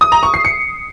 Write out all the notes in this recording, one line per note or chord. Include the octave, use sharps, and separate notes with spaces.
D#6
A#5
C#6
C7
C#7